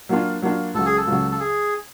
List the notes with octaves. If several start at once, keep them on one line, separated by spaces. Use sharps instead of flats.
F#3 A#3 D4 F4
F#3 A#3 D4 F4
C#2 C#3 F#3 A4
G#4
A4
C#2 C#3 F#3
A4
G#4